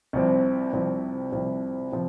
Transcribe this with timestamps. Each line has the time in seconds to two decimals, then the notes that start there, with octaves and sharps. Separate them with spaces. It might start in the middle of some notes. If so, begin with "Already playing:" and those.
0.13 C2 C3 F3 C4
0.73 C2 C3 F3 C4
1.32 C2 C3 F3 C4
1.92 C3 F3